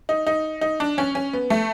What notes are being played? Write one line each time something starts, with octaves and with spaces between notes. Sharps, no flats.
D#4
D#4
D#4
D4
C#4
C#4
B3
A3